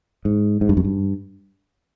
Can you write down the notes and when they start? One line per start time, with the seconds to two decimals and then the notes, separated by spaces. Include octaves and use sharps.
0.25 G#2
0.61 G#2
0.69 G2
0.77 F#2
0.85 G2